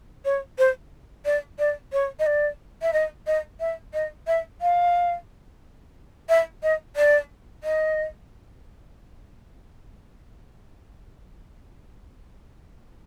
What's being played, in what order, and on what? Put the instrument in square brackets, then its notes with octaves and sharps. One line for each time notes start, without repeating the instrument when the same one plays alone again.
[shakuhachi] C#5
C5
D5
D5
C#5
D#5
D5
E5
D#5
D#5
E5
D#5
E5
F5
E5
D#5
D5
D#5